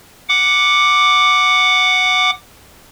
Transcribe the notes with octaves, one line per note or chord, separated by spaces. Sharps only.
F#5 D6